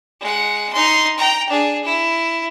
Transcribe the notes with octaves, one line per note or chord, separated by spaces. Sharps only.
G#3 F#5
D#4 C6
G5 A#5
D4 G#4
E4